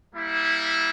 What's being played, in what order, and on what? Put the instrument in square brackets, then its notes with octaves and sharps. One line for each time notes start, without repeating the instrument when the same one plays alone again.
[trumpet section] G3 A#3 E4